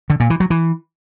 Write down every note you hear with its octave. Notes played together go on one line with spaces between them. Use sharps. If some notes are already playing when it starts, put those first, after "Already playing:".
D3
A#2
E3
F#3
E3